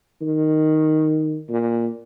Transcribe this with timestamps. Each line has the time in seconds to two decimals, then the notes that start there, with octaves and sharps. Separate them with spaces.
0.21 D#3
1.49 A#2